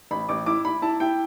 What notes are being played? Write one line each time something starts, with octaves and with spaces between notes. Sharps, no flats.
A1 B5
A1 D6
E4 D6
E4 B5
E4 A5
E4 G5